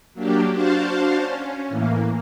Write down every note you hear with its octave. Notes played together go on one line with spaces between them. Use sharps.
F#3 A#3 D4 G4
D4 F#4 C5 F5 A5
C#4
A2 E3 A#3